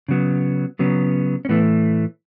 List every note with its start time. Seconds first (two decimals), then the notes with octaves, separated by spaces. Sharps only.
0.08 C#3 F#3 B3
0.79 C#3 F#3 B3
1.45 C#4
1.49 A2 E3 A3 B3